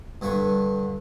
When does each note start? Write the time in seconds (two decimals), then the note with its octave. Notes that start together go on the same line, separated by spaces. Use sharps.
0.21 G2 D3 B4 C#6